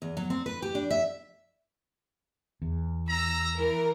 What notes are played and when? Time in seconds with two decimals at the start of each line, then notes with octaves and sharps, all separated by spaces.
0.02 E2
0.17 F#3
0.30 C4
0.46 B4
0.62 G4
0.75 D4
0.91 E5
2.62 E2
3.09 A#5 E6
3.57 E3 A#4